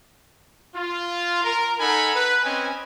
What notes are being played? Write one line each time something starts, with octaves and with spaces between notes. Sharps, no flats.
F4
A#4
D#4 A4 A#4 F#5 G#5 B5
B4
C4 C#4 B4 D#5 G#5